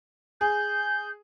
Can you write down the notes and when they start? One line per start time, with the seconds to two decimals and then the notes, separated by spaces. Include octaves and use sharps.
0.41 G#4 G6